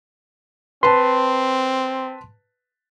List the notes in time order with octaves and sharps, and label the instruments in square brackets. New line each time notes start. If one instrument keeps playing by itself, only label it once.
[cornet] C4 [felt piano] B4 A5 [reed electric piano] C6